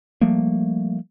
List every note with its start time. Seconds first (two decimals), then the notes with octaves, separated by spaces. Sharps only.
0.21 F3 G3 A3 A#3